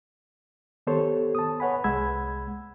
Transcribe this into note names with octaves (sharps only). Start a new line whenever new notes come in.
D#3 B3 G4 A4 C5 C#5
A5 D#6
B4 C#5 F#5 G#5 B5
C2 G#3 F#5 B5 E6 G#6